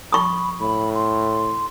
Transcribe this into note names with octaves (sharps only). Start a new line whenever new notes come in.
B5 C#6 D#6
A2 B5
C6